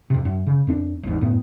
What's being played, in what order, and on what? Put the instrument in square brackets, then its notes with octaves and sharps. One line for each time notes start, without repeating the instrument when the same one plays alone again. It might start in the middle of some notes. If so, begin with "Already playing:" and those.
[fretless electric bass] F2 C3
F#2
C#3
F2 C4 D4
G#1 E2 G#2
F1 F#2 A2 B3